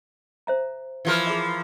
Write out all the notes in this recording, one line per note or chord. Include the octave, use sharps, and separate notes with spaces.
C5 E5 A#5
E3 F3 A#4
G#4 E5